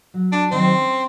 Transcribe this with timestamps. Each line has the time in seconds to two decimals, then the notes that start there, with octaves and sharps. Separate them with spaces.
0.14 F#3
0.32 D4
0.51 D#3 F#3 C4
0.75 C#4